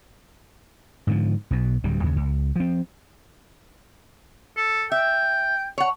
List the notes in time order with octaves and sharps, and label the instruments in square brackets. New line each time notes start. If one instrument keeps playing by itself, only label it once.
[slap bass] G#2 D3 F3
B1 B2
D1 D2 G3
D#2 C#3
C#2
F3 C4
[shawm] A4
[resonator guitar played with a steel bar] E5 [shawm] G5
[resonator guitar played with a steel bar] C#5 F#5